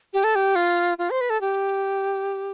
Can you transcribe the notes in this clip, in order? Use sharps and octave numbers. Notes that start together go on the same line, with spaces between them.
G4
A4
G4
F4
F4
C5
B4
A4
G4